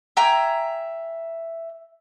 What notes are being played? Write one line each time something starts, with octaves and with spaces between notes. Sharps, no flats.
E5 G5 G#5 A#5